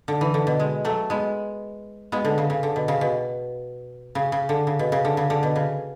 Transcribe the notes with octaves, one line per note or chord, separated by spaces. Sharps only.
D3
E3
D3
B2
G#3
F#3 A3
G#3 B3
G#3 B3
D3
C#3
C#3
D3
B2
C#3
B2
C#3
C#3
D3
C#3
B2
C#3
D3
C#3
D3
B2
C#3